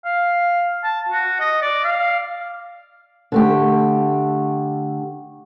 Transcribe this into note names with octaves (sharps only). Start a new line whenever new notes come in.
F5
A5
F#4
D#5
D5
F5
D3 A3 G4